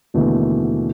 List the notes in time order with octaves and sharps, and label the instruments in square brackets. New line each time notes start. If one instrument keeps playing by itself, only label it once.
[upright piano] D#2 B2 D3 E3 A3